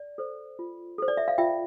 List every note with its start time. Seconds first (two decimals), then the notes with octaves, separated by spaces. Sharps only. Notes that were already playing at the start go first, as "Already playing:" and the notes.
Already playing: D5
0.18 A4 C5
0.59 F4
0.98 A4 C5
1.08 D5
1.17 E5
1.28 F5
1.38 F4 E5 G5